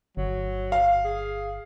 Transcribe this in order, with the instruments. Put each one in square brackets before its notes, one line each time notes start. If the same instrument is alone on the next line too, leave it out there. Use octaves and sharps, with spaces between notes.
[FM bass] G1 [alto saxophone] F#3
[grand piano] F5
[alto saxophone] G#4